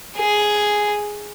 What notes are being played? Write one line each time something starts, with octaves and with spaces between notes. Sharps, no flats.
G#4